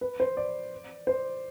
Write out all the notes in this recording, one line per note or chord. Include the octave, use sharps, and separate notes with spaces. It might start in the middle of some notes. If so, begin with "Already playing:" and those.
B4
C5
D5
C5